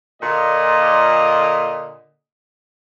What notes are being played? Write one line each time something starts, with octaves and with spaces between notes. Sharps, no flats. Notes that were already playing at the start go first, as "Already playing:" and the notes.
A#2 D3 D#5